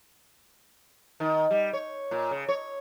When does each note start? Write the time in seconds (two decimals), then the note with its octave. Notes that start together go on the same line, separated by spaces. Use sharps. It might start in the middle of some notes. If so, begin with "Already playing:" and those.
1.20 D#3
1.51 G3
1.73 C#5
2.11 A#2
2.31 C#3
2.48 C#5